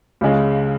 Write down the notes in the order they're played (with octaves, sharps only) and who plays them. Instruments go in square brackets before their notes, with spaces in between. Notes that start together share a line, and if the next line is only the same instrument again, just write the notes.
[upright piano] C#2 C#3 G#3